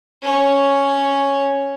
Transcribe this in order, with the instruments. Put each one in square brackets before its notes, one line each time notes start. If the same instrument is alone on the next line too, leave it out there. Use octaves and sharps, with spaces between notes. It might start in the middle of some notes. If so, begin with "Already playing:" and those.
[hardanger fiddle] C#4 C#5